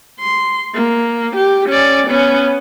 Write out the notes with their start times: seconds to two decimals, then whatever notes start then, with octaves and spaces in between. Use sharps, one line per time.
0.20 C6
0.74 A#3
1.36 G4
1.69 C#4 D5
2.07 B3 C#4